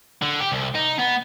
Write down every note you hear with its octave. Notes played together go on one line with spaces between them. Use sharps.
D3
G4
C2
D#4
B3